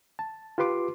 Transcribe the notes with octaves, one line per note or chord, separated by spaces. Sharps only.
A5
F4 G4 B4 C6 D6